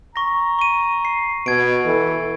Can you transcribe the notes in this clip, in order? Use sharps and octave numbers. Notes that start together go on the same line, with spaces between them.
A#5 C#6 A#6
C#6 D#7
C7
B2 G#6 D7
E3 A4